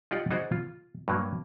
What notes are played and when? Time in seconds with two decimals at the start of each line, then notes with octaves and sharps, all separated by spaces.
0.11 D#4 F4 G4 D5 F#5
0.31 D#4 F#4 G#4 C5 D5
0.52 F4
1.08 G2 F#3 A#3